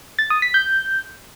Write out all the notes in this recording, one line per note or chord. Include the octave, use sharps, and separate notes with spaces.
A6
D#6
B6
G6